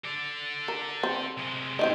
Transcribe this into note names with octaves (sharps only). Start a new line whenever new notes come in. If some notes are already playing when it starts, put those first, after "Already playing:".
A4 D5
A#4
C4
C3 G#3
C4 D#4 E4 C#5 D#5